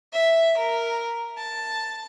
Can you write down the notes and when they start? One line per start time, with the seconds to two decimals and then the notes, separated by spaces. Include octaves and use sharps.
0.13 E5
0.57 A#4
1.37 A5